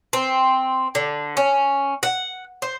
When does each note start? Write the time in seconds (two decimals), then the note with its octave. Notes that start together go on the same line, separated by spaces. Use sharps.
0.13 C4
0.95 D3
1.37 C#4
2.03 F#5
2.62 C5